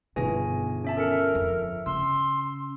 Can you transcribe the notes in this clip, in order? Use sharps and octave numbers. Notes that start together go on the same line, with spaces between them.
G1 B2 D#3 B3 G#4 G#5 A#6
C#4 E5 A5
A4 A#4 E5 C#7
F2
C#3 C6 E6